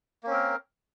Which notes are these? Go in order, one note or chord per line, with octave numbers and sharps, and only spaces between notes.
A#3 C4 C#4 A#4